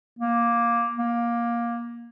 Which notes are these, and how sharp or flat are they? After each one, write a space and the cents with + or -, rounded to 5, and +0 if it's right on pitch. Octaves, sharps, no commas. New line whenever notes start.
A#3 +10
A#3 +15